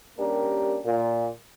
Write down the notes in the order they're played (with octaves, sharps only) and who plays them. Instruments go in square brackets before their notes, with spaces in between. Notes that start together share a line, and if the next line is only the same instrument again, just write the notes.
[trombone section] G3 A#3 C#4 D4 G4 A#4
A#2